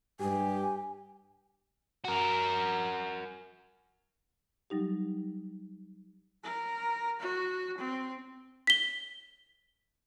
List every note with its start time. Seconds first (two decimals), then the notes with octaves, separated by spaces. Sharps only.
0.20 G2 G4 G#5
2.04 F#4 A#4
4.70 F#3 G3 D#4 G4
6.43 A#4
7.20 F#4
7.78 C4
8.67 B6 G7